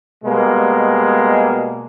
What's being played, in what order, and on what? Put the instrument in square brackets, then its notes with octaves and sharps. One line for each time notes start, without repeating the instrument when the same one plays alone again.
[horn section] B2 G3 G#3 A#3